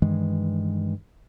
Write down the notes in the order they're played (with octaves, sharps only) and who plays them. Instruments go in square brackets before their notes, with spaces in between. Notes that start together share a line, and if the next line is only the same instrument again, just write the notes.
[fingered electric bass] G2 D#3 E3 G#3